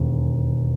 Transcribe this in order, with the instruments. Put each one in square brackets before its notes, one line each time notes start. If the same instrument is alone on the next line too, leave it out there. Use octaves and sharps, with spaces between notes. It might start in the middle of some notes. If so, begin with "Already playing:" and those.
Already playing: [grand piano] E1 D#2